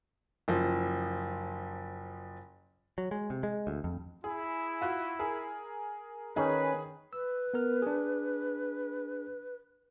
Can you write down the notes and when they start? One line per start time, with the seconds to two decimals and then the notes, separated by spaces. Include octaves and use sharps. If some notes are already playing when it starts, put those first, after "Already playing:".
0.48 F#1 F3
2.98 F#3
3.11 G#3
3.30 C3
3.43 G#3
3.67 D2
3.84 F2
4.24 E4 G#4
4.81 F4 F#4
5.19 G#4 A#4
6.36 D#3 C#4 D#4 G#4 B4
7.13 B4 E6
7.54 B3 A#4 F6
7.82 D4 G#4